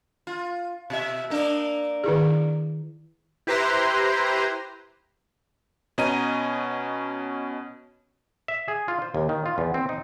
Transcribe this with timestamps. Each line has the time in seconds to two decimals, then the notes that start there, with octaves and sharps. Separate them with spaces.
0.27 F4
0.90 B2 E5
1.30 A#3 D4 A#4
2.04 D#3 E4 G#4
3.47 E4 G4 B4 C5 A#5 C6
5.98 B2 C#4 D#5 A#5 D#7
8.48 E5
8.68 G#4
8.88 F4
9.02 C5
9.15 D#2
9.29 D#3
9.46 F4
9.58 E2
9.74 C4
9.89 D#4